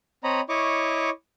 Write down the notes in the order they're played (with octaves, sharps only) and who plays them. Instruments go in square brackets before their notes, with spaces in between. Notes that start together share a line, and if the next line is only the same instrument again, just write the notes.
[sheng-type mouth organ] C4 C#5 D#5 A#5 B5
E4 C#5 D#5 C#6 D6